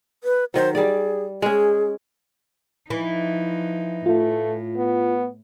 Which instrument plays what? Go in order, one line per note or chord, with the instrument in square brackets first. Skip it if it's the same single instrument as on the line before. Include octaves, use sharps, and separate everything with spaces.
[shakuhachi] B4
[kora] D#3 F#3 [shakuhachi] C5
[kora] G3 D5 [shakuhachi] G#4
[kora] G#3 C#4 [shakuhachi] G#4
[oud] E3 [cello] F3 D#4
[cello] A2 [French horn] A3 [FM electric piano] F4
[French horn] B3